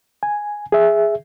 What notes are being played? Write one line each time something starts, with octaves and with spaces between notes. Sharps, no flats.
G#5
G#4 E5